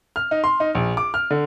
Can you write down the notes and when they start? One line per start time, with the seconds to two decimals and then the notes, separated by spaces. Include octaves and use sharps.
0.16 F6
0.31 D#4
0.44 C6
0.60 D#4
0.75 A#1
0.97 D6
1.14 F6
1.31 D3